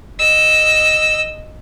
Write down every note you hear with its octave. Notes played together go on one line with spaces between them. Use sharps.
D#5 E6